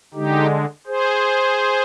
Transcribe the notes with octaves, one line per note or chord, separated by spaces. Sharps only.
D3 G#3 D#4 G4
G#4 C5